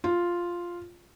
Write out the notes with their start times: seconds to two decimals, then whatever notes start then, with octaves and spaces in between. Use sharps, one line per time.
0.04 F4